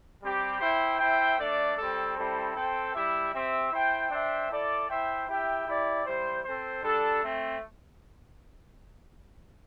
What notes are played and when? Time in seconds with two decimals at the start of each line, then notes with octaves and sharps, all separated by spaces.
0.22 G3 C4 G4
0.61 E4 C5 E5 G5
1.00 E4 C5 E5 G5
1.38 A3 D4 A4 D5
1.77 G3 C4 A4
2.16 G3 C4 E4 A4 C5
2.55 C4 A4 C5 G5
2.95 G3 E4 G4 E5
3.33 C4 G4 E5
3.72 E4 C5 G5
4.11 D4 C5 E5 G5
4.50 E4 A4 D5
4.89 E4 C5 E5 G5
5.28 E4 G4 E5 G5
5.66 E4 G4 D5
6.05 G3 E4 C5
6.45 C4 A4 C5
6.83 G3 D4 A4
7.22 A3 C4